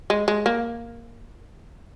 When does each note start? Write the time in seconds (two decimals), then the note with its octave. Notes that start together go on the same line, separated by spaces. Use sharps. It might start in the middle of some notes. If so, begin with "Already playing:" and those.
0.10 G#3
0.28 G#3
0.46 A#3